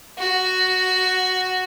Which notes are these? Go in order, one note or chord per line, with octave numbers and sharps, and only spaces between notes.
F#4